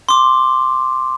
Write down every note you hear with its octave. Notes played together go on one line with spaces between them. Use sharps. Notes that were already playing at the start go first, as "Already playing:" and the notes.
C6 D6